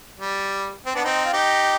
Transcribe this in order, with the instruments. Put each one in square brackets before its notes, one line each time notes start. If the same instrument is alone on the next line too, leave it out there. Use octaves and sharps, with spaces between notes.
[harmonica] G3
C4
B3 D4
C4 D#4
F4
D#4 G4